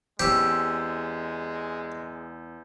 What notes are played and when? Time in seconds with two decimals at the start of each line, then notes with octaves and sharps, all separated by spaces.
0.20 E2 G#3 C4 C#4 G4 E6 G6